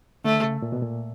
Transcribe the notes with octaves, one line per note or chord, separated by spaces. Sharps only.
D3 A3
C#3
A#2
B2
A#2